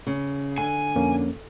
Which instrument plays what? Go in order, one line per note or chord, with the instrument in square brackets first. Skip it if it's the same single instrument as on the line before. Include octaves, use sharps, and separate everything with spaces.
[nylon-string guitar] C#3
[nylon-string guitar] D3 [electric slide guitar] G#5
[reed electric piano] F2 A#3 C#4